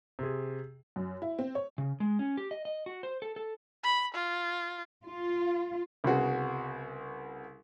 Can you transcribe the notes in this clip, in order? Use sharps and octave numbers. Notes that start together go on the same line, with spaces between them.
C3 G#4
F#2
E4
C4
C#5
C#3
G#3
C#4
G4
D#5
D#5
F#4
C5
A4
A4
B5
F4
F4
C2 C#3 B3 F#4 G#4